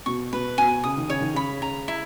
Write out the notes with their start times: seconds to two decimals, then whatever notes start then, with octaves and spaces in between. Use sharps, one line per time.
0.06 B2 C#6
0.33 B2 B4
0.58 B2 G#5
0.84 C#3 D#6
0.97 D#3
1.08 C#3 C#5
1.21 D#3
1.34 C#3 B5
1.62 C#3 A#5
1.88 E4